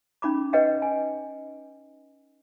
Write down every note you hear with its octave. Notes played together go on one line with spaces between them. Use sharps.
C#4 D#4 B5 D6
B4 C#5 D#5 F#5 G5
G#5